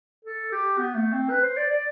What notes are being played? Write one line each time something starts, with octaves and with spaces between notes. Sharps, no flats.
A4
G4
B3
A3
C4
B4
C5
D5
D5